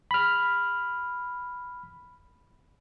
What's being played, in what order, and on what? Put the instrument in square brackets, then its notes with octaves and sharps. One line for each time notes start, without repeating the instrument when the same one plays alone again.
[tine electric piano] B5 F6